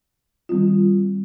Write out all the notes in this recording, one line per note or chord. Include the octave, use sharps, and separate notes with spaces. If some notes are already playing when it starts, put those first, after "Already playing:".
D#3 G3 C4 F4